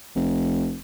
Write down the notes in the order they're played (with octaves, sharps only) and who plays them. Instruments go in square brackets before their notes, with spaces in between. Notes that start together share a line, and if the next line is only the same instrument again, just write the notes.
[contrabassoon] F1